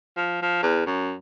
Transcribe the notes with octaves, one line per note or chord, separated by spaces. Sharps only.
F3
F3
E2
F#2